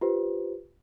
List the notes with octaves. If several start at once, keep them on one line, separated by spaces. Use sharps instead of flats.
F4 G4 B4 C5